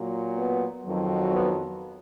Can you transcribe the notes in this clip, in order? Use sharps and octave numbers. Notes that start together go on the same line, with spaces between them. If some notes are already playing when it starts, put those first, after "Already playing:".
Already playing: A#2 F#3
B3
F2 D#3 F#3
B3